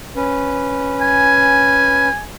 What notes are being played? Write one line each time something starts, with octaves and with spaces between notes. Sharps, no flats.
C#4 B4
G#5